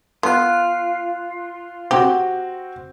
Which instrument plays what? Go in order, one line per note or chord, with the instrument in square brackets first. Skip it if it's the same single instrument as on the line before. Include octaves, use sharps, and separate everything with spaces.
[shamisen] B3 [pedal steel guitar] F4 [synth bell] C6 F#6
[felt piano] C4 F#4 [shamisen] G4